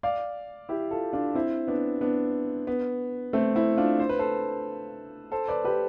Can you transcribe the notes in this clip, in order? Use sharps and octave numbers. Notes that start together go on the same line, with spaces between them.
D5 F5
E4 G4
F4 A4
D4 F4
C4 E4
B3 D4
B3 D4
B3
A3 C4
C4 E4
D4 F4
C5
B4
A4 C5
A4 C5
B4 D5
G4 B4